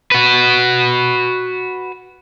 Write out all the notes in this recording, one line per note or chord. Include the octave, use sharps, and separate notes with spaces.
F#4 B4